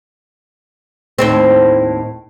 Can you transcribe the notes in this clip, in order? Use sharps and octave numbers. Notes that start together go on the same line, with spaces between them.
D#2 A2 C4